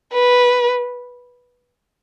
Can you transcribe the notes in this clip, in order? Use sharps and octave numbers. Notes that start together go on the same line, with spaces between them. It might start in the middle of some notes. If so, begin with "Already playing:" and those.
B4